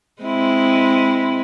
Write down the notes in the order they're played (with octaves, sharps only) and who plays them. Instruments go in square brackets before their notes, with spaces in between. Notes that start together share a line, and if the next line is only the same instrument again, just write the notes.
[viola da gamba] G#3 C4 E4